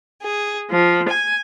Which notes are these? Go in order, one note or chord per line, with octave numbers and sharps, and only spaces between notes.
G#4
F3
G#5